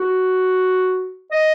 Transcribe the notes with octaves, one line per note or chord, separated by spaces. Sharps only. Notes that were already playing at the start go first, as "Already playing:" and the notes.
Already playing: F#4
D#5